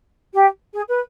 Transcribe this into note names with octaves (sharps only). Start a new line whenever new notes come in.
G4
G#4
B4